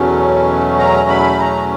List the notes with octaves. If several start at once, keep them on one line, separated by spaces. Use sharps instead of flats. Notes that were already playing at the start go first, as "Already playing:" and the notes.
Already playing: E2 B2 F#3 A3 C#4
A#5
B5
A#5